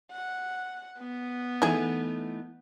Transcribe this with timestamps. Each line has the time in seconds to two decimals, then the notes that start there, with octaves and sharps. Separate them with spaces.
0.12 F#5
1.00 B3
1.62 E3 A3 D#4 E4 G#4